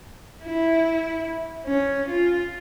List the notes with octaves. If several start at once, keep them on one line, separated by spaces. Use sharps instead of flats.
E4
C#4
F4